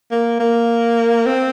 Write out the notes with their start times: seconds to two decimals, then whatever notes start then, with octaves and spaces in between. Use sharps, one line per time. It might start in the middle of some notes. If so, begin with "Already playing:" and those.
0.11 A#3
0.40 A#3
1.26 C4